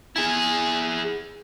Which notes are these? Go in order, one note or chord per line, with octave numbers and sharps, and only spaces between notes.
E4 G#4